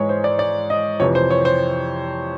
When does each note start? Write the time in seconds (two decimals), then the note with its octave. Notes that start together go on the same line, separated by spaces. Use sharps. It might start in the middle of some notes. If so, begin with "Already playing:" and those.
Already playing: G#2 E3 G#3 C#5
0.09 C5
0.24 D5
0.39 D5
0.70 D#5
1.00 F2 C3 E3 C#5
1.15 C5
1.31 C#5
1.45 C5